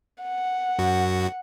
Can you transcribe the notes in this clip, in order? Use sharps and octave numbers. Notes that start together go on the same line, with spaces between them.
F#5
F#2 F#4